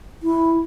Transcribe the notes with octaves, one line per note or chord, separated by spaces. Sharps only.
E4